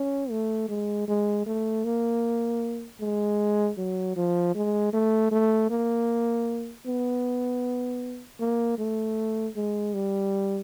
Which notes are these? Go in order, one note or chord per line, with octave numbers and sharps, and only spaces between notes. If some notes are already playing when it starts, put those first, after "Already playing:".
Already playing: C#4
A3
G#3
G#3
A3
A#3
G#3
F#3
F3
G#3
A3
A3
A#3
B3
A#3
A3
G#3
G3